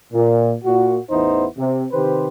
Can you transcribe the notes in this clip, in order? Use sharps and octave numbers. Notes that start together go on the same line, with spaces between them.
A#2
A#2 F#4
A1 E2 B3 D#4 E4 C5
C3
C3 D#3 G4 B4 C5